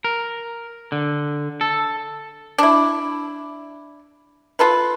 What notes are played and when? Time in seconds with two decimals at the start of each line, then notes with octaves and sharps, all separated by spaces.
0.05 A#4
0.92 D3
1.61 A4
2.58 D4 E4
4.59 F4 A4 B4